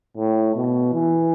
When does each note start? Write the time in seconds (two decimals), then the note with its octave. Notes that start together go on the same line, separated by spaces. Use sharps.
0.17 A2
0.55 B2
0.94 E3